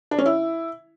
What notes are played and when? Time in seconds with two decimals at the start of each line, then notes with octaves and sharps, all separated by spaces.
0.11 D4
0.19 C#4
0.26 E4